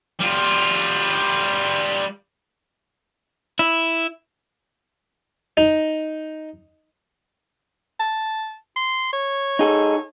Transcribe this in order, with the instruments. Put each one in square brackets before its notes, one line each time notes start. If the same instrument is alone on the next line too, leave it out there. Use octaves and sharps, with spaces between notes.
[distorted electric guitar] G3 F4
[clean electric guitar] E4
[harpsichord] D#4
[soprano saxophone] A5
C6
C#5
[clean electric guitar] D#4 G#4 A4